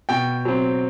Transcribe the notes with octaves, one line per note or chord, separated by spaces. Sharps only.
B2 G5
F#3 C4